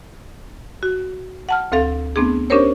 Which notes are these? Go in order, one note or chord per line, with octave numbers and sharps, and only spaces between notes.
F#4
F#5 A5 F6
D2 C4 A4 F5
A3 B3 C4 D4 G#4
C#4 D4 G4 A#4 C5 C#5